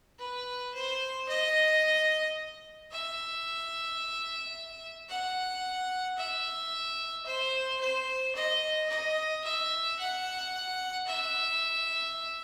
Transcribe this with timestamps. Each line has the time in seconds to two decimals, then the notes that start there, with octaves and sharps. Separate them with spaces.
0.20 B4
0.75 C5
1.29 D#5
2.92 E5
5.09 F#5
6.18 E5
7.26 C5
7.81 C5
8.36 D#5
8.90 D#5
9.44 E5
9.99 F#5
11.07 E5